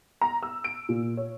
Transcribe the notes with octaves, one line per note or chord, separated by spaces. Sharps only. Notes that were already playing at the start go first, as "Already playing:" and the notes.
A#5
E6
D7
A#2
C#5